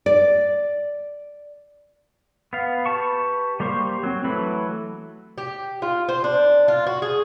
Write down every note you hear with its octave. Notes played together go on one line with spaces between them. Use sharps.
D5
B3 F5
G4 B4 A5 C#6
G3 A#3 G4 C5 C#6
F#3 C4
E3 F#3 A3 B5
G4
F4
C5
D4
F4
F#4
G#4